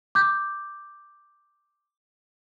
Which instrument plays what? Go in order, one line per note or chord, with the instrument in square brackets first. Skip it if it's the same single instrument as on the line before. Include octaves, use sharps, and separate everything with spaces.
[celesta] D6 G6